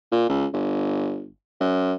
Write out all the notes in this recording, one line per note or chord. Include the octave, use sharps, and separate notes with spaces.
A#2
C#2
G1
F#2